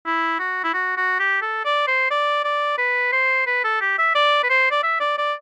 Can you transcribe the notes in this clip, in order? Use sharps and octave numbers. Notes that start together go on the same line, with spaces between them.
E4
F#4
E4
F#4
F#4
G4
A4
D5
C5
D5
D5
B4
C5
B4
A4
G4
E5
D5
B4
C5
D5
E5
D5
D5